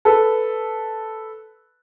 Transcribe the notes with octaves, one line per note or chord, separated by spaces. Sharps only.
A4 B4